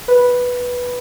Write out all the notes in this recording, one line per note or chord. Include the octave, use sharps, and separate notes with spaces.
B4